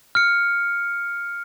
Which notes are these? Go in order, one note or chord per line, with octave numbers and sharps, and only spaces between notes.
F6 C#7